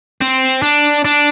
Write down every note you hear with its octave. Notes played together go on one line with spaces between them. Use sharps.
C4
D4
D4